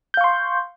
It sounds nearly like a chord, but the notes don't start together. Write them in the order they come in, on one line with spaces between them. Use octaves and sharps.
G6 F5 C#6 C6